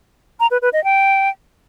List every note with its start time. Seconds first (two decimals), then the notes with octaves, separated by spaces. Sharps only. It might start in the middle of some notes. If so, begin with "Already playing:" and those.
0.40 A#5
0.51 B4
0.62 B4
0.73 D#5
0.84 G5